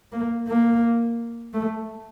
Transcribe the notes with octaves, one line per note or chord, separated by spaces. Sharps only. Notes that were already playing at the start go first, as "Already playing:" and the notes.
A#3
A#3
A3